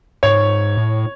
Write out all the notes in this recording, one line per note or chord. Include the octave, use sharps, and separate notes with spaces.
G#2 C#5
A2